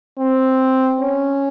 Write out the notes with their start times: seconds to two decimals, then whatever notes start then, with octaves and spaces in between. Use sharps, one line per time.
0.18 C4
1.00 C#4